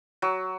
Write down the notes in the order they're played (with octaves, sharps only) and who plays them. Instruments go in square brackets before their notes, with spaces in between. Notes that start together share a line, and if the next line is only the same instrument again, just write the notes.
[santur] F#3